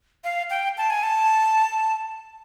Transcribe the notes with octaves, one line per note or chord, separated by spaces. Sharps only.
F5
G5
A5
G#5
A5